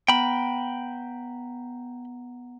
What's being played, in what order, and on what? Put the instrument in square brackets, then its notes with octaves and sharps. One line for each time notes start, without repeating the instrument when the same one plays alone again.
[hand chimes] B3 F#5 A#5 [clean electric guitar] G5 B5